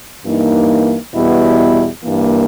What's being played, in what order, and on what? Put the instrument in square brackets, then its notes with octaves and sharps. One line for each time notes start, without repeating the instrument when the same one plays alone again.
[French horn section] G2 E3 A#3 D#4
E2 B2 G3 B3 E4
G2 E3 A#3